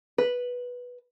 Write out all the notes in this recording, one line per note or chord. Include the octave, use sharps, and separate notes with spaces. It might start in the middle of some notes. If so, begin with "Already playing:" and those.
B4